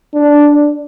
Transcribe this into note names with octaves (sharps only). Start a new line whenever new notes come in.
D4